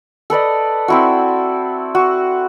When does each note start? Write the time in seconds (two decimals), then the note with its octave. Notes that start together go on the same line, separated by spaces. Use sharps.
0.30 A4 B4 D5 D#5
0.88 C4 E4 F#4
1.95 F#4